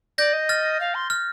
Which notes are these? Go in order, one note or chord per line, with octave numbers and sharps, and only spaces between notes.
D5 G6 A#6
D#5
F6 A6
F5
C6
F6